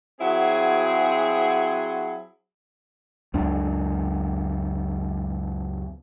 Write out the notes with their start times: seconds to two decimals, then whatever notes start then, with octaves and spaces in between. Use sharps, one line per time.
0.21 F#3 C4 E4 F#4 G#4
3.34 C#2 F#2 D4